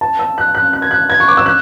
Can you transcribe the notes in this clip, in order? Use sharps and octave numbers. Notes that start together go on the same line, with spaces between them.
A5
E6
F#6
F#6
F#6
G#6
F#6
G#6
C#6
D6
E6
F#6